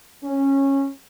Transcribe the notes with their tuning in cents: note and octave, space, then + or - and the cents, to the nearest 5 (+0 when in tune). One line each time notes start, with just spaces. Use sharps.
C#4 -15